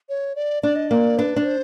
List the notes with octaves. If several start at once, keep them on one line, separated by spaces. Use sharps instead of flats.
C#5
D5
D4 D5
D#5
A#3 D5
D4 B4
D4 B4
C5